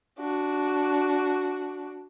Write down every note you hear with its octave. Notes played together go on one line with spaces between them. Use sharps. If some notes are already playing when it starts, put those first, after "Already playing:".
D4 F#4